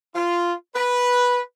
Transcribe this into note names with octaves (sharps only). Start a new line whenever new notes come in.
F4
B4